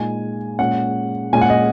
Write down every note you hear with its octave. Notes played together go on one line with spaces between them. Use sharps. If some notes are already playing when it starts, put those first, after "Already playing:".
Already playing: A#2 G#3 D#4 G#5
A#2 G#3 C#4 F#5
A#2 G#3 C#4 G#5
F#5
D#5